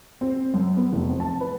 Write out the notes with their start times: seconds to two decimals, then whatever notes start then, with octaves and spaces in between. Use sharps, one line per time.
0.21 C4
0.54 F#2
0.77 B3
0.93 F1
1.09 C4
1.20 A5
1.40 B4